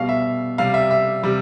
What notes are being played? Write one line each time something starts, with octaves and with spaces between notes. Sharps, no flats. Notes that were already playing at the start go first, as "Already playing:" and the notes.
Already playing: B2 G3 F5
E5
C3 G3 F5
E5
E5
C3 G3